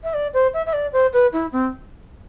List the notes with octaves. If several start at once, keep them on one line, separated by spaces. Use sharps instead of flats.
E5
D5
C5
E5
E5
D5
C5
B4
E4
C4